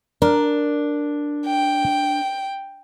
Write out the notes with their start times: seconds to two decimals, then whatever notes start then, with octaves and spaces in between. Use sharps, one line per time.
0.22 D4 A#4
1.46 G5